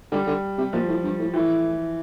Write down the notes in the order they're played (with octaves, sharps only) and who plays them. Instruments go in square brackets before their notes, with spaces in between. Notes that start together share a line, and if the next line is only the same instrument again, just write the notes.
[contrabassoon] D3 [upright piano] G3
[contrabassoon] D3
C3
[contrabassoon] A#2 [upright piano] F3
[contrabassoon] A2
G2
A2
[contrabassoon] A2 [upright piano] E3